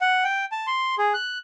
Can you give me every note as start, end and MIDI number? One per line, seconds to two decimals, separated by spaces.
0.01 0.24 78
0.24 0.45 79
0.52 0.66 81
0.67 0.95 84
0.98 1.13 68
1.14 1.38 90